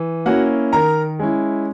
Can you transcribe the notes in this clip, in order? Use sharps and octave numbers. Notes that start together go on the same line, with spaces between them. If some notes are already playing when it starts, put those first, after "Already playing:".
Already playing: E3
A#3 C#4 E4 F#4 F#5
D#3 A#4 A#5
G#3 C#4 E4